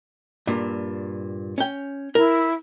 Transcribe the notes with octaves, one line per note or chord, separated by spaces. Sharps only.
G2 A#2
C#4 G5
E4 A#4